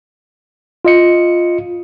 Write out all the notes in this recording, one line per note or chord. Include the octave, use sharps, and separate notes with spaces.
F4 D#5 C#7